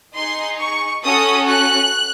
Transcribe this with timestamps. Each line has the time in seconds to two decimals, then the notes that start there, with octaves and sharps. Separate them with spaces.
0.14 D#4 G#4 C6
0.59 C#6
1.04 C#4 F#4 A4 D#6
1.49 F#6